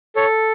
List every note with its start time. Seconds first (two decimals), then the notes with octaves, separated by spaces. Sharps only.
0.16 A4 C#5